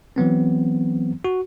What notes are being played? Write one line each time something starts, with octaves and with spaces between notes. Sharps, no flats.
E3 F#3 B3 C4
F#4